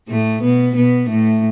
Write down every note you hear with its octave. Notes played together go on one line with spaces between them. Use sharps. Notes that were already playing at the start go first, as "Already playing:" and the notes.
A2 A3
B2 B3
B2 B3
A2 A3